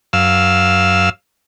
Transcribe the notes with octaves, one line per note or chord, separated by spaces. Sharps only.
F#2 F5 E6